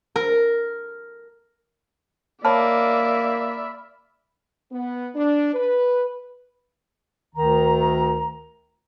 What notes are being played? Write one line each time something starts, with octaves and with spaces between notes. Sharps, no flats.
A#4
A#3 C#5 D5 E5 A5 B5 F6
B3
D4
B4
D2 D#3 A#5